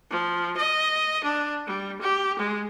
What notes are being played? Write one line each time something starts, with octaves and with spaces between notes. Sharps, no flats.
F3
D#5
D4
G3
G4
G#3